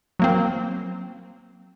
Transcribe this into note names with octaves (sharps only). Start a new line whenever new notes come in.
F#3 A#3 C4